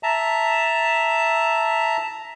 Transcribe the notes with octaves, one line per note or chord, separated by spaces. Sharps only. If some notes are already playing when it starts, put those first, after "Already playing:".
E5 A5 A#5